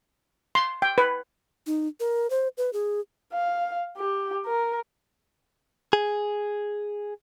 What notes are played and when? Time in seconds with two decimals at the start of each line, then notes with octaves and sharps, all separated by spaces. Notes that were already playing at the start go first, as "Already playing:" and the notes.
0.55 C6
0.82 G5
0.98 B4
1.66 D#4
2.00 A#4
2.30 C5
2.57 B4
2.73 G#4
3.33 F5
3.97 G4
4.46 A#4
5.93 G#4